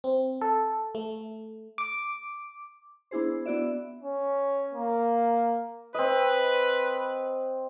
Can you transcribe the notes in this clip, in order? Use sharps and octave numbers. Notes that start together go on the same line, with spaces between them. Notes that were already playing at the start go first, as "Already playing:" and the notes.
C4
A4
A3
D6
B3 D4 E4 G#4 C5
B3 D4 E4 F#4 D5 E5
C#4
A#3
C4 B4 D#5